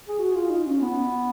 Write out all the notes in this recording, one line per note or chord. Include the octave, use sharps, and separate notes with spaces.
G#4
F#4
F4
D#4
C#4
B3